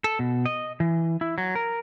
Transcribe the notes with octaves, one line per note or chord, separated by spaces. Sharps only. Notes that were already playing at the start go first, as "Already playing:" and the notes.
A4
B2
D#5
E3
E4
F#3
A#4